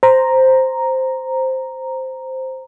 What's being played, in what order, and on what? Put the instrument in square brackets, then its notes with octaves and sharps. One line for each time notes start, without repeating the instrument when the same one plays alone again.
[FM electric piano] C5 A#5